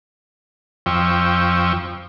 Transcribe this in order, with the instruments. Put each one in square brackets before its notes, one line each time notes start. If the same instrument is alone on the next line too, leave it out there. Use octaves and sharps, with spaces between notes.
[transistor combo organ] F2 F3 G5 C#6 E6